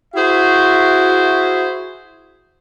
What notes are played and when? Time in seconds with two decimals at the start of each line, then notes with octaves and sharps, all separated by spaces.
0.15 E4 F#4 G#4 C5 E5